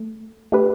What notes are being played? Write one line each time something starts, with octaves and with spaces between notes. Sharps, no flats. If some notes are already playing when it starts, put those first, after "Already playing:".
Already playing: A3
A3 D4 G4 B4